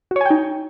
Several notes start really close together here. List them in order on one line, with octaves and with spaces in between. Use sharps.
F#4 C#5 G#5 G5 D#4